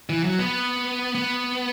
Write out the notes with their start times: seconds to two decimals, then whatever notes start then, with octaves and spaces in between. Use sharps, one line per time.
0.09 E3
0.23 F#3
0.39 B3
1.15 B3